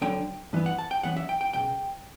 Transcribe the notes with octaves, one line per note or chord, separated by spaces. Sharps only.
D2 D3 F#3 G5
G2 E3 B3
F#5
A5
G5
F#2 E3 B3 F#5
E5
G5
G5
C#2 B2 G5